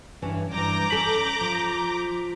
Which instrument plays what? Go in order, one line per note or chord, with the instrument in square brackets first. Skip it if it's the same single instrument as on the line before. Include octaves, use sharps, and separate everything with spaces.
[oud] G2 E3 C#4
[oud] G2 E3 [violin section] A#5 D6 G6
[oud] C#4 A4 [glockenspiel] B6 F#7
[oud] F3